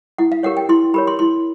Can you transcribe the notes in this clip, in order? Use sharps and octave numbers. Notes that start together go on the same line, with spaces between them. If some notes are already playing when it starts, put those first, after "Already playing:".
E4 F#5
F5
G4 A#4 C#5 F#5
G5
E4 C6
G4 A#4 C#5 B5
C6
E4 C6